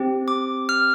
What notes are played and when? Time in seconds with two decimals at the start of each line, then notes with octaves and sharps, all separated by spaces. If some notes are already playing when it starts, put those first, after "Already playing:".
Already playing: C4 G4
0.28 D6
0.69 F6